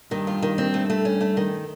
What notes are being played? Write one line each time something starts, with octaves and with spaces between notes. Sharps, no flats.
G2 D#3
F4
D#3
C4
A3
A3
C#4
A3
D#3